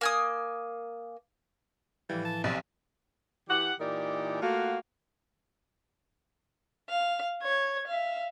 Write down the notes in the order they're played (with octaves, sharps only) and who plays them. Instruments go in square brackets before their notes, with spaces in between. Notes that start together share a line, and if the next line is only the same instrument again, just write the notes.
[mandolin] A#3 G#5 D#6
[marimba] A2 F3 [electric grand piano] E3 [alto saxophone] G3
[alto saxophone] A5
[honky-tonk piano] B1 [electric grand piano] C3 [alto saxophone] D5
[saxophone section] E3 G4 F#5
A#2 E3 D#4 G4 A#4 D5
A3 A#3 F4 F#4
[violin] F5
C#5 G#6
E5 F5